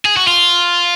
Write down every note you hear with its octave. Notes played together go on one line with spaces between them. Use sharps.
G#4
F#4
F4